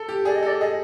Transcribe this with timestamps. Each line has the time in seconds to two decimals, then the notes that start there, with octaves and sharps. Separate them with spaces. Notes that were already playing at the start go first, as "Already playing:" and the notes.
Already playing: A4
0.09 G4
0.25 G#4 D5
0.36 D#5
0.43 A4 D5
0.61 G#4 D#5